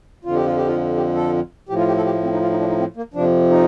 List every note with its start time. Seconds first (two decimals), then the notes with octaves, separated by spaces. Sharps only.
0.25 F2 D3 F3 F4
0.35 G4
0.45 F4
0.57 G4
0.66 F4
0.96 G4
1.15 A4
1.69 A2 F3 G4
1.79 F4
1.87 G4
1.97 A4
2.06 G4
2.14 A3
2.23 C4
2.33 D#4
2.42 F4
2.50 D#4
2.60 D4
2.69 D#4
2.78 C4
2.96 A#3
3.14 F2 C3 F3 D4
3.50 D#4